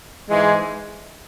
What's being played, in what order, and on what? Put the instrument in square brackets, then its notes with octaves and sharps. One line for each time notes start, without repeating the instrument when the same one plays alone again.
[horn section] G#2 E3 G#3